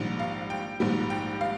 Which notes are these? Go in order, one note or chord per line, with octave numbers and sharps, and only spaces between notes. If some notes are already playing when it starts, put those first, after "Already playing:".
Already playing: A#1 G#2 D#3 G3
F5
G5
A#1 G#2 D#3 G3
G5
F5